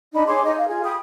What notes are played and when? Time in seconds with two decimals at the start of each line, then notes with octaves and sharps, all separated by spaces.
0.13 D4 D#4 B5
0.27 G#4 C#5 C6 D6
0.44 D#4 D#5
0.57 F5
0.68 F4 G#4
0.83 G5 B5 D#6